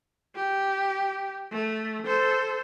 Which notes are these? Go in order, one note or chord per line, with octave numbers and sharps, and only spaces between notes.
G4
A3
A4 C5